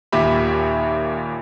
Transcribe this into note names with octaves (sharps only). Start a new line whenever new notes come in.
D#2 A#2 G4 E5 B5